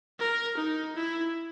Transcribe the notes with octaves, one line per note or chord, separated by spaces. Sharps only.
A#4
D#4
E4